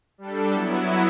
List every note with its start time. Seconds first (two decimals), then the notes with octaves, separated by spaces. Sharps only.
0.18 G3 D4 A4
0.52 F#3 B3 E4